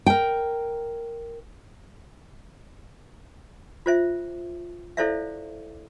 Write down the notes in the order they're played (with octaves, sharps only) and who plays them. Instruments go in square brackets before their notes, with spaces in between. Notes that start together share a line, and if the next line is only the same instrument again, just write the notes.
[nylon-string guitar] A#4 G5
[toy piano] F4 C5 E5
E4 A4 C5 D5 E5 F5